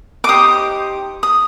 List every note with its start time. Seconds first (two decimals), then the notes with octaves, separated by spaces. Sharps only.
0.24 D6
0.29 D#4 G4 C5 D#6
1.23 D#6